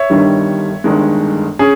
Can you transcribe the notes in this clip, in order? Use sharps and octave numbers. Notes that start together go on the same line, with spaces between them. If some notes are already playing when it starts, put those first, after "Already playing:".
Already playing: C#5 E5
G1 G2 D#3 G3
G1 G2 D#3 G#3
C#4 G#4